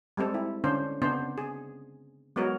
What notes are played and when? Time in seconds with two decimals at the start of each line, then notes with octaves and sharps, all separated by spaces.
0.17 G3 G#3 C4 A4
0.34 E4
0.64 D3 C#4 D4 C5
1.02 C#3 B3 C4 D4 C5
1.38 G#4
2.36 F#3 G#3 B3 F#4 A#4 C#5